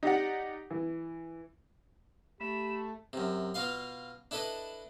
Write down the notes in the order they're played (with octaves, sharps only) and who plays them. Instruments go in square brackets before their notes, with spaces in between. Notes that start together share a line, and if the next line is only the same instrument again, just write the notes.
[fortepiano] D#4 G4 D5 F#5
E3
[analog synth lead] A3 [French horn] G4 [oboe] B5 [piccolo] E7
[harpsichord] F#2 C3
B2 F4 F5 C6
D4 E4 A4 B4 D#5